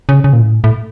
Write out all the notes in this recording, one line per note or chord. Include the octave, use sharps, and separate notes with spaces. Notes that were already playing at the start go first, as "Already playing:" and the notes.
C#3
C#3
A#2
A2
A2